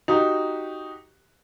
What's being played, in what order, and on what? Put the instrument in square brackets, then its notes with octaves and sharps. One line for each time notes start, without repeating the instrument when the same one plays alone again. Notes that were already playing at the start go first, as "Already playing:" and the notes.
[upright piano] D#4 F#4 G4